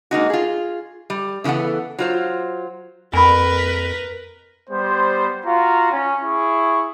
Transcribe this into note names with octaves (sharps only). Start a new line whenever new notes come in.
G#3 A#3 D#4 F#4
F4 G#4
G3
C#3 E3 B3 A4 F#5
F#3 F4 C5
F2 A#4 B4 G#5 B5
G3 B3 C5
F4 F#4 F5 A#5
C#4
E4 G#4 C#6